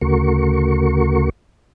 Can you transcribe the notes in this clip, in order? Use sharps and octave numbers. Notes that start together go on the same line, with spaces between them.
D2 C#3 A3 F#4 A#4 C#6